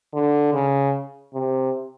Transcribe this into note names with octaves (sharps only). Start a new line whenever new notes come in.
D3
C#3
C3